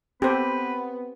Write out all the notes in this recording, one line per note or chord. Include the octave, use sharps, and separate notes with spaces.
B3 C4 G4 A4 B4 C5